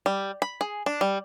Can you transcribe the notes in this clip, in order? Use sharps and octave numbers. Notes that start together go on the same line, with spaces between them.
G3
B5
G#4
D4
G3